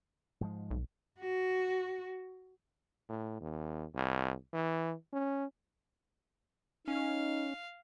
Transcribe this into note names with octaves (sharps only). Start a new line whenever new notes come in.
G#2 F3 G#3
B1
F#4
A2
D#2
C2
E3
C#4
C#4 D#4 F5